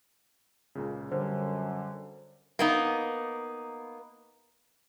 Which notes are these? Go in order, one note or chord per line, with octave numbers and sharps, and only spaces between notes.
C#2 A#2 C#3
F#2 D3 G3 C5
A#3 B3 D#4